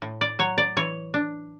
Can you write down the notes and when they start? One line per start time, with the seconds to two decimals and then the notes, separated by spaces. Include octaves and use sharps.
0.02 A2
0.21 D5
0.39 F#3 C#5
0.58 D5
0.77 E3 C#5
1.14 D4